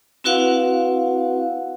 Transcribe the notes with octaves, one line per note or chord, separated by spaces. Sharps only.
C4 E4 F#4 B4 F5 F#5